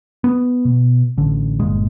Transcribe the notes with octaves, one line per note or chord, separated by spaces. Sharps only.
B3
B2
A1 D3
G1 D#2 A#2 G#3